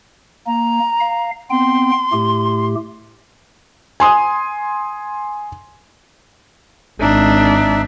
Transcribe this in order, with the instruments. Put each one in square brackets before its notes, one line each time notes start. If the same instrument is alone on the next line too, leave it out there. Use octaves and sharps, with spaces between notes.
[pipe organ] A#3 [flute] A#5
[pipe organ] F5
[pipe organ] B3 C4 G5 [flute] C6
[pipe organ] A2 A3 G4
[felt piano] G#5 C6 D#6
[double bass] G#1 [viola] D4 [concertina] D#4 E5